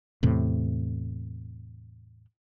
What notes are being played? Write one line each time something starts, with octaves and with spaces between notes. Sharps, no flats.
E2 A2 C3